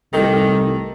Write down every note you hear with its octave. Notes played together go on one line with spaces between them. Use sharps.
C2 D#3 A3 G4 A4